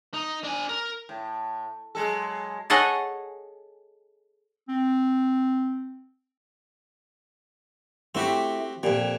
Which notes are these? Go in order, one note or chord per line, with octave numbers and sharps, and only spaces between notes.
D#4
D4 G#5
A#4
A2
F#3 G#3 A4
G#4 A4 C#5 D#5 F#5 G#5
C4
A3 C4 E4 F#4 G4
F2 A#2 G4